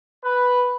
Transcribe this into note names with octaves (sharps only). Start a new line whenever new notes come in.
B4